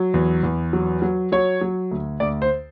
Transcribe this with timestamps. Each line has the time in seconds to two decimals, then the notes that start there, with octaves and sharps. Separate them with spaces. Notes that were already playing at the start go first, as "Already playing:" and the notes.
Already playing: F#3
0.14 E2
0.43 E2
0.73 F#3
1.02 F#3
1.32 F#3 C#5
1.61 F#3
1.91 D2
2.20 D2 D5
2.42 C5